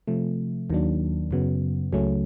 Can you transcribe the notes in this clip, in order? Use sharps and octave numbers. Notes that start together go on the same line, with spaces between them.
C3 F3 A3
D#2 D#3 F#3 A#3 D4
F#2 C#3 F#3 B3
C#2 C#3 F#3 A3 C#4